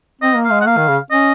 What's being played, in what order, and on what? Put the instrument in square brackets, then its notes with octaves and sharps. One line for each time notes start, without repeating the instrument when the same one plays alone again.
[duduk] C4 [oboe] D#5
[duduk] A#3
[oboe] F5
[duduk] G#3
[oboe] F#5
[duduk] A#3 [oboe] F5
[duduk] D#3
C#3
[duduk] C#4 [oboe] D#5